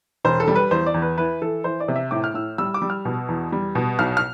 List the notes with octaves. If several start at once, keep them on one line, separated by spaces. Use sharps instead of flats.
E1 C5
A4
G3
B4
E2 C5
D5
E2
B4
E3 B4
E3 A4
E3 C5
D5
C3
E5
A2 D6
F6
A2 E6
G3 E6
D6
G3
F6
B2
E2
G3
B2
B1 F6
F6